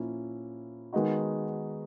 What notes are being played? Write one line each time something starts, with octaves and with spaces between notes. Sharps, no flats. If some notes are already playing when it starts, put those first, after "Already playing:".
Already playing: A#2 F3 A#3 C#4 E4
D#3 G#3 B3 D#4 F#4